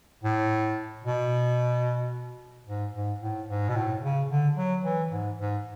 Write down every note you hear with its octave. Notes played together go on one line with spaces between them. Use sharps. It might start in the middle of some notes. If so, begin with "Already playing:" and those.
A2
B2
G#2
G#2
A2
G#2
B2
A2
C#3
D3
F#3
E3
G#2
G#2